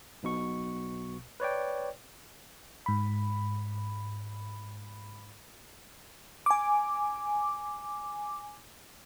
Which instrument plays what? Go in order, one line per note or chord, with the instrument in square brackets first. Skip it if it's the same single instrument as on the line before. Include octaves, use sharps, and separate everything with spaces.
[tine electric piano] B1 B2 C#6
B4 C#5 D5 G5
[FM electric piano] G#2 B5
G#5 D6